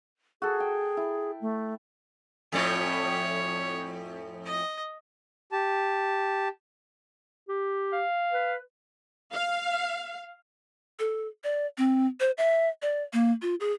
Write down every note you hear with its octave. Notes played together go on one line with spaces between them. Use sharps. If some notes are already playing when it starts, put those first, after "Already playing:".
F#4 G#4 A4
G5
E4
A3
F2 A2 C#5 D5
D#5
G4 A5
G4
F5
B4
F5
A4
D5
C4
C5
E5
D5
A#3
F4
G#4